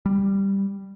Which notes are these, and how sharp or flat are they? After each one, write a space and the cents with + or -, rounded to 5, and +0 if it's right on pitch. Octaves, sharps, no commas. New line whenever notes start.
G3 +5